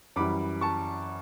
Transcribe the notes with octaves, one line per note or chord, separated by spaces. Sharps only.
F#2 E3 G3 B5 D6
A5 C#6